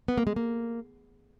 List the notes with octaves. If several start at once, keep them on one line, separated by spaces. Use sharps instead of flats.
B3
A#3
G#3
A#3